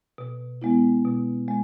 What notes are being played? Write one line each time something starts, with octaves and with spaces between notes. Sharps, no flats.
B2
G#3 B3 E4
B2
G#3